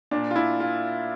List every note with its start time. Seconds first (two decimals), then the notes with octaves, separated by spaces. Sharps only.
0.11 A#2 D4
0.31 F4
0.36 E4
0.60 F4